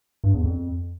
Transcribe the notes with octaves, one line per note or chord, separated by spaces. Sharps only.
G2
E2
F2